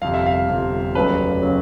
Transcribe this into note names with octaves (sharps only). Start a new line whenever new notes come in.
G1 F2 C3 F5
E5
F5
G1 F2 C3
F1 D#2 C#3 F#3 B4
C#3 F#3